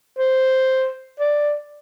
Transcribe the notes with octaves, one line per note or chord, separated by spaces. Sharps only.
C5
D5